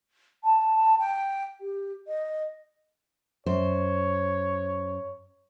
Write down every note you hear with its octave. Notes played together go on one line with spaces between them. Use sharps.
A5
G5
G4
D#5
F#2 C5 C#5